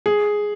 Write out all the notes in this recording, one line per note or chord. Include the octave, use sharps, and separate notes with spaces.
G#4